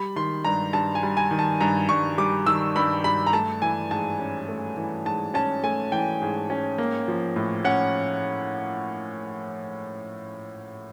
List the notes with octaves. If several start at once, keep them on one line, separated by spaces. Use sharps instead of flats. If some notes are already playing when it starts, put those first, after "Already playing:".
Already playing: G3 B5
D#3 C6
G2 A#5
G2 A5
G#5
G3
G#5
D#3
A5
G2 A#5
G2 C#6
G3 D6
D#3 E6
G2 B5
G2 B5
A#5
A3 A5
E3 G#5
G#2 A5
C#4
A3
E3
G#2 A5
C#4 A5
A3 G#5
E3 G5
G#2
C#4
A#3
F3
A2
C#4 F#5